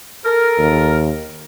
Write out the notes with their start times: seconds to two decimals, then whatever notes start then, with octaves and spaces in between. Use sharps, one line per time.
0.24 A4 A#4
0.58 D#2